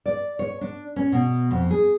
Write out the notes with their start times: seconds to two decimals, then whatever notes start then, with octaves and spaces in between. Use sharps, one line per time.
0.06 D5
0.39 C#5
0.61 D4
0.96 C#4
1.12 B2
1.51 F2
1.71 G#4